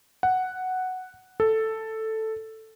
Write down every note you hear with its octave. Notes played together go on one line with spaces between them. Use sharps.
F#5
A4